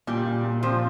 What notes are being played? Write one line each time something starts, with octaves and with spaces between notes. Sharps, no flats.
A#2 G3
A#2
A#2
F3 C4